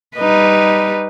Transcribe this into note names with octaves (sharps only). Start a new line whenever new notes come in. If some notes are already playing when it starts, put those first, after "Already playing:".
G3 D#4 B4